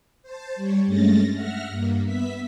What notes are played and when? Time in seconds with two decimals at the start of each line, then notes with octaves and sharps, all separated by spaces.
0.22 C5 A5
0.56 G3 C#5
0.86 G2 G#3 A3 C#4 A6 A#6
1.33 E5 F#5 F6 A#6
1.69 G2 A#3
2.05 B3 E5 B6